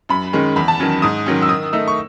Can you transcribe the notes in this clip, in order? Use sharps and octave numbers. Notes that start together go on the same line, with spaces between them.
F#2 B5
D#3 G#3 C#4
E2 B5
A5
D#3 F#3 C#4
G#2 D#6
D#3 F#3 C#4
E6
D#3 D#6
A3 D#4 E6
C#6